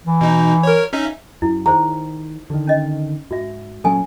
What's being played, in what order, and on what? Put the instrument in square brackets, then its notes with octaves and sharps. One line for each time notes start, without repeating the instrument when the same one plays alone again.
[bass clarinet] E3
[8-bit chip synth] B2 D#4
A#4 C#5
C#4 D#4 E5
[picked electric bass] F#2 [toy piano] E4
[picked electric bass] D#3 [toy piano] G#4 C5 [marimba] A#5
[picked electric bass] D3 D#3
[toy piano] C#4 D#5
[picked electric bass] G#2 [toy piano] F#4 E5
[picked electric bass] A#2 F#3 C#4 [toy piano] A4 G#5